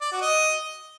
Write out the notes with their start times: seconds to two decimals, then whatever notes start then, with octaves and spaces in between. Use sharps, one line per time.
0.01 D5
0.12 F#4
0.22 D#5